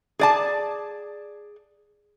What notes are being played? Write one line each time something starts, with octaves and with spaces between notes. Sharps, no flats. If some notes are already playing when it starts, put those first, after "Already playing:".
G#4 D5 A5